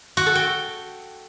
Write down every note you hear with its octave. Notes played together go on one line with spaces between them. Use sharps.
F#4
A4
G5